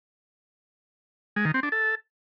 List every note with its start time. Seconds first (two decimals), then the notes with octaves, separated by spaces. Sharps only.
1.36 G#3
1.45 D#3
1.54 C4
1.63 D4
1.72 A4